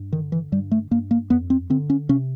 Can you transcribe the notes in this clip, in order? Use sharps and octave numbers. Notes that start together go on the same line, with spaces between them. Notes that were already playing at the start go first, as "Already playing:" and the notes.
Already playing: G2
D3 D#3
E3
G2 G3
A3
G2 A#3
A#3
F2 B3
C4
D3 C4
C#4
C3 C#4